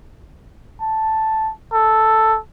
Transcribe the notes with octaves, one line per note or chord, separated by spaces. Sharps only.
A5
A4